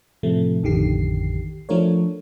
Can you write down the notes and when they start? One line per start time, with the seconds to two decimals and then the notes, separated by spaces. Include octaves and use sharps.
0.23 A2 C3 F3 A3
0.63 A1 F2 D3 D#3 G4 C7
1.69 F3 A3 D4 F4 A#4 C#5